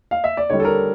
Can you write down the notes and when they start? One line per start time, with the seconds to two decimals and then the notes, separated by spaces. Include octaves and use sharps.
0.11 F5
0.24 E5
0.37 D5
0.50 D3 G3 C#5
0.60 A4
0.65 A#4